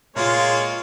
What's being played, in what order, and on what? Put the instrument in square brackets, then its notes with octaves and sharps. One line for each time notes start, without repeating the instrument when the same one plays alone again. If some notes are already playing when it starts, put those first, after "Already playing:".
[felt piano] A#2 [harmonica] G#3 A#3 C#5 [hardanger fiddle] F4